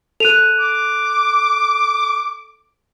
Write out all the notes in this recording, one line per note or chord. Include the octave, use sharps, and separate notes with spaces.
A4 F#6 D#7 F7
D6